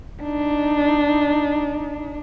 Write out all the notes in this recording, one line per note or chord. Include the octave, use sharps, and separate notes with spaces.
D4 D#4